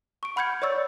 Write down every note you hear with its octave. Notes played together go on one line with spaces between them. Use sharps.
C#6 D7
F#5 B5 F6 G6 G#6 C#7
C#5 D5 C#6 E6 A6